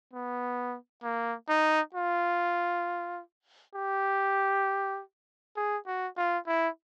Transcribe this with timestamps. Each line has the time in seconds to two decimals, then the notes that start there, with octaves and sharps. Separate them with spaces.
0.13 B3
1.03 A#3
1.49 D#4
1.94 F4
3.75 G4
5.57 G#4
5.87 F#4
6.17 F4
6.47 E4